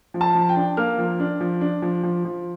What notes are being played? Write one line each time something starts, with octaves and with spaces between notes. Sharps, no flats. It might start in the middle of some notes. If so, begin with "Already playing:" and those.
F3
A5
F3
G5
D4
A#3 F6
F3
D4
F3
D4
F3
F3
F3